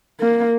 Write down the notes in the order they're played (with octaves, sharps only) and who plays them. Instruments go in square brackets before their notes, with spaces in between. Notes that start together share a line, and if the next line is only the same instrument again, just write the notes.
[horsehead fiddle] A#3